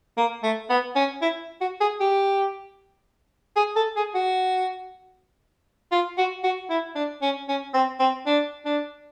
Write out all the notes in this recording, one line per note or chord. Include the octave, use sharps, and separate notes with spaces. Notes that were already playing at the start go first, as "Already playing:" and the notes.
A#3
A3
B3
C#4
E4
F#4
G#4
G4
G#4
A4
G#4
F#4
F4
F#4
F#4
E4
D4
C#4
C#4
C4
C4
D4
D4